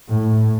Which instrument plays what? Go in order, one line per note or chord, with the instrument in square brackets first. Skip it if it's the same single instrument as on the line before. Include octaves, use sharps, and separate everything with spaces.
[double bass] A2